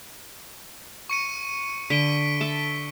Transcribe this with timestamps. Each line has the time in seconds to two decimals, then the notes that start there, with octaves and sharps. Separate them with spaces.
1.10 C#6 C#7 D#7
1.90 D3 B6 D7 G7
2.41 A4 E5